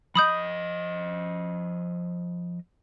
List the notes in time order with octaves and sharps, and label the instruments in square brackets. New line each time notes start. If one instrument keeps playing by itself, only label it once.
[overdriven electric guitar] F3 D#5 [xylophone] B5 D#6 G6